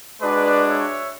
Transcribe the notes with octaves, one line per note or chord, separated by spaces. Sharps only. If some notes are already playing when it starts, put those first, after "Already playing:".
G#3 D4 F#4 B4 D5
C#5 E5